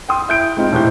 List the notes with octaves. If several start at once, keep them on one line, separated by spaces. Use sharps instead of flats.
G5 C6 D#6
E4 G6 D7
G#3 C4 D#4 F4
E1 A2 G4 C5 G6